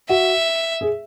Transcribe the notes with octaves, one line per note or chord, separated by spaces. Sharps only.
F#4 E5
G#4